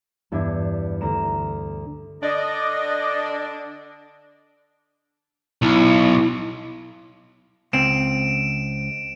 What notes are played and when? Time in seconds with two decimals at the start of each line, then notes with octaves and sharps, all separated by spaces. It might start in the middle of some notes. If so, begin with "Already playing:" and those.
0.32 E2 G2 D4 E5 G#6
1.01 D2 A#5 E7
2.23 D3 D4 D5 D#5
5.62 B1 E4
7.73 C#2 C4 D7 E7